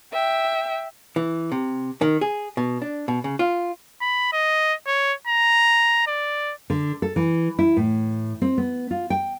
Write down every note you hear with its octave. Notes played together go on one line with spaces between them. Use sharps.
E5 G5
E3
C3
D#3
G#4
B2
D4
B2
C#3
F4
B5
D#5
C#5
A#5
D5
D3
A4
E3
E4
A2
C4
B3
F4
G5